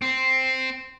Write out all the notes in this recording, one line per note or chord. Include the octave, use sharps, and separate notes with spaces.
C4